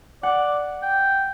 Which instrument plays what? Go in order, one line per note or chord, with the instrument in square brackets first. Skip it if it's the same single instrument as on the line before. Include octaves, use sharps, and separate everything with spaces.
[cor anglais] D5 [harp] F#5
[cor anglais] G5